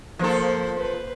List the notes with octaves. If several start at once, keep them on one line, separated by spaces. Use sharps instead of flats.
F3 A#3 A4 C5
B4 C5